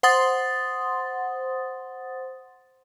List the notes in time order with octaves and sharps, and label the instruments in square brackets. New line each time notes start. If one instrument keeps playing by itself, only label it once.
[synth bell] C5 F#5 C6 D#6 A6